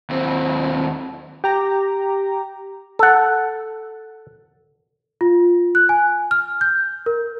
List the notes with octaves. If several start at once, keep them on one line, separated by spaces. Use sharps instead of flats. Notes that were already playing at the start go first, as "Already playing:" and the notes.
D#2 C4
G4 A#5
A4 F#5
F4
F#6
G#5
F6
G6
A#4